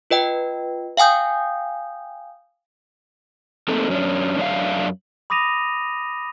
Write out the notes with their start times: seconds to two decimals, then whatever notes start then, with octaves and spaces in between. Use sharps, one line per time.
0.11 F4 B4 D#5 G5
0.97 F5 G5 G#5 D#6 G6
3.68 A3 A#3 C4 D#4 A4
3.89 F#2 C#4 D4
4.38 F#2 D4 C#5 E5 F5
5.30 B5 D6 D#6 A#6 D#7 F7